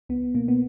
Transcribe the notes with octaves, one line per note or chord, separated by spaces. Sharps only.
C#2 B3
B2 A#3
B3